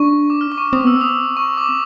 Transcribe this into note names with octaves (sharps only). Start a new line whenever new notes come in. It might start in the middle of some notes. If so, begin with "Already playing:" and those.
Already playing: D4 C#6
D6
F6
D6
C#6
D6
C4 D#6
B3 E6
C4 E6
D#6
C#6
D6